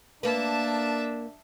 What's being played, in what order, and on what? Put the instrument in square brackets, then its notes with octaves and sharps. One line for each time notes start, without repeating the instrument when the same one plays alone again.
[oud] A#3 B4 [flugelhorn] D4 [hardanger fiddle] E5 A5